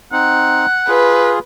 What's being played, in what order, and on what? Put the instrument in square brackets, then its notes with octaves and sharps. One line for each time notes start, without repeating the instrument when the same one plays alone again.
[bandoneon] C4 D#4 [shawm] F#5
[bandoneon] F4 G#4 [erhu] B4